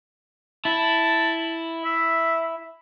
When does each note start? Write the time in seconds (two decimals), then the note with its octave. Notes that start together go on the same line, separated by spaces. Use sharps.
0.65 E4 A5
1.84 E5